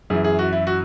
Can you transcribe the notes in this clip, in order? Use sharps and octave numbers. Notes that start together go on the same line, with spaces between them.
F#2 E3 G#4
G#4
F#4
E4
F#4